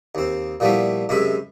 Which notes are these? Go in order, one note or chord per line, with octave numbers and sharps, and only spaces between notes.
D#2 C4
A#2 F3 G3 A3 B3 E4
F#2 C3 G#3 C#4 E5 B5